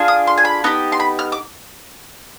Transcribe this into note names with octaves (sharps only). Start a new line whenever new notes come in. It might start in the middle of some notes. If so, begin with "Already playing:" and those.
Already playing: D4 F4 G#4
D#6
C6
G#5
B5
B3 D#4 G4
C6
B5
F6
D6